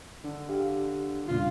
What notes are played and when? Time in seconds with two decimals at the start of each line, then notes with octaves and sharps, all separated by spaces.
0.24 D3
0.49 G4 F5
1.28 E2 G2 A#2 C#3 F4